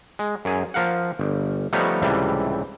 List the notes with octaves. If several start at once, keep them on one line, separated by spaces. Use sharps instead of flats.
G#3
F#2 G#4
F3 A#4 F5 F#5
G1
F3 G3 A3 B3 D#4 C#5
C#2 A2 C3 E3 G3